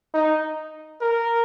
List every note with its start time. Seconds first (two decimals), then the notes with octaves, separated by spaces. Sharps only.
0.14 D#4
1.01 A#4